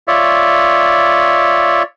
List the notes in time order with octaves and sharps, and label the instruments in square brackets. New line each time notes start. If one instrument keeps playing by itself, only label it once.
[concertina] F4 C#5 D5 E5